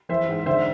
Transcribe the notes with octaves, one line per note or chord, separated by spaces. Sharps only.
E3 C5 E5
G#2
D3 C5 E5